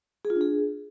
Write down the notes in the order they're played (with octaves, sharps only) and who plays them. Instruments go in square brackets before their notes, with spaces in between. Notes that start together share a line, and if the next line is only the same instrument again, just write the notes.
[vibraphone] G#4
F4
D4
G#4